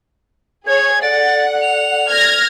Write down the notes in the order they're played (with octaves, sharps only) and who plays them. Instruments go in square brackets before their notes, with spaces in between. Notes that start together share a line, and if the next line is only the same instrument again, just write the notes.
[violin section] G#4 C#5 [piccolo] G#6
[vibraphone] A4 D5 [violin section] F#5 [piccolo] A6
[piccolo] F7
[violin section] F6 G#6 A#6